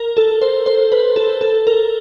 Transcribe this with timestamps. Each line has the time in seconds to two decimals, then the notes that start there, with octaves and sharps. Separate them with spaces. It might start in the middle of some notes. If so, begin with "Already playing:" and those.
Already playing: A#4
0.17 A4
0.42 C5
0.66 C5
0.92 B4
1.16 A4
1.41 A4
1.67 A#4